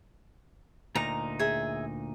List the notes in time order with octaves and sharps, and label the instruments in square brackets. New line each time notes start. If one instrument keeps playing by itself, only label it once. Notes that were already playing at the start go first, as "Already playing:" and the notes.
[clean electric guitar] D2 A#2 D#4 [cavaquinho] A#5
[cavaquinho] G#4 E5